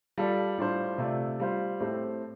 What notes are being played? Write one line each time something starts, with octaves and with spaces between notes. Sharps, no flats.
G3 F4 A4 D5
A2 G3 D4 F4 C5
C3 A3 F4 D5
G3 F4 C5
A2 A3 C4 G4 C5